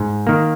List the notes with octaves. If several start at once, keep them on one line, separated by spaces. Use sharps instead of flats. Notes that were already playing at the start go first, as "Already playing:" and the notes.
Already playing: G#2
D#3 A#3